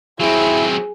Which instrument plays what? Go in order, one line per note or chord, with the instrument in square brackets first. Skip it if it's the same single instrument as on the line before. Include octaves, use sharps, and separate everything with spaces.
[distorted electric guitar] F#3 C4 [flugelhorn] E4 [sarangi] G#4